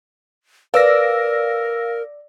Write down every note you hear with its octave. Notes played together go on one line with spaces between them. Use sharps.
A#4 B4 D5 F5 E6 A#6